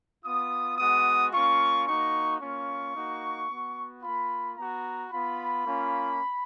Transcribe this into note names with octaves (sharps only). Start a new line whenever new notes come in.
B3 F4 D#6
G#3 B3 F#4 D#6
A#3 C#4 F4 C#6
A#3 D#4 F#4 C#6
A#3 C#4 F4 C#6
A#3 D#4 F#4
B3 F#4
A#3 F4 B5
B3 F#4 A#5
B3 F4 B5
A#3 C#4 F4